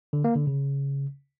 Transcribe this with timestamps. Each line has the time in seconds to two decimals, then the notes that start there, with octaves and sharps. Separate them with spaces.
0.13 D3
0.24 A#3
0.36 D3
0.47 C#3